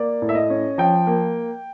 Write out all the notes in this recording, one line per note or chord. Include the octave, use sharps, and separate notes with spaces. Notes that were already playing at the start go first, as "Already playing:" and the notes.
Already playing: A#3 D5
A2
E5
D#5
C#4
F3 G5
A#3